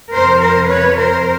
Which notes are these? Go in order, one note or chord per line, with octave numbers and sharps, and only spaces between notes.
F2 C3 F3 A#4 C5
A#4 C5
B4 C#5
A#4 C5